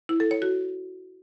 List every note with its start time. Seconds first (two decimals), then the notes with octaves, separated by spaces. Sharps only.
0.09 E4
0.20 A4
0.31 C#5
0.42 F#4